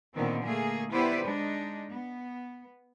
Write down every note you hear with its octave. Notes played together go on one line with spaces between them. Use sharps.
A#2 D3 D#3 B3 C4
A3 A#3 G#4
B3 E4 G4 B4 C5 D5
G#3 D4 D#4
B3